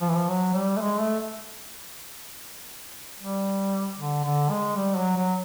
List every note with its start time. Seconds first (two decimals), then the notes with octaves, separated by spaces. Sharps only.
0.01 F3
0.09 E3
0.16 F3
0.28 F#3
0.54 G3
0.76 A3
0.81 G#3
1.00 A3
3.18 G3
3.97 D3
4.24 D3
4.50 G#3
4.76 G3
4.97 F#3
5.16 F#3